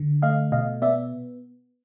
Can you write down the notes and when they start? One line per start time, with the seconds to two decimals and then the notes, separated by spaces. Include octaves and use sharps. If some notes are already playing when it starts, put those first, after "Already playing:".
Already playing: D3
0.22 A3 D#5 F5
0.52 B2 D#5 F5
0.82 B3 D5 E5